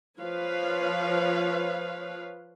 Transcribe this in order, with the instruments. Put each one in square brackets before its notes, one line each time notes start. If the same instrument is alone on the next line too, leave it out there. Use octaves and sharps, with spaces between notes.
[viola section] F3 B4 C#5 F5